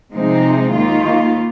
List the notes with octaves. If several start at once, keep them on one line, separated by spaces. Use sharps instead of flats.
C3 F3 G#3 C4 D#4
D#2 D#3 A#3 F4